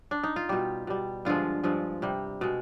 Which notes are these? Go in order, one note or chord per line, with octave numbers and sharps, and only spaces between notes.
D4
D#4
F4
B2 G3 G4
B2 G3
G2 D3 F3 G#3 F4
G2 F3 G#3
C3 G3
B2 G#3